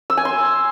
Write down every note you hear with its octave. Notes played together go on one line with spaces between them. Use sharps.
E6
G#5
C6